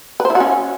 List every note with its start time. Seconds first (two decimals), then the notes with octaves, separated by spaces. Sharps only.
0.20 B4
0.25 C5
0.30 E4
0.35 F#4
0.40 C#4